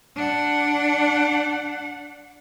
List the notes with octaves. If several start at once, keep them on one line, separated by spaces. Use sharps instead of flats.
D4 F#5